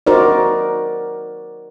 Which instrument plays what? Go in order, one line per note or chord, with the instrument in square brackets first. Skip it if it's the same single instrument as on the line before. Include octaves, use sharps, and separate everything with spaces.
[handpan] D#4 F#4 A#4 C5 D5